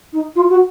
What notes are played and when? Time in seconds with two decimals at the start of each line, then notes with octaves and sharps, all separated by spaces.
0.13 D#4
0.35 F4
0.50 F#4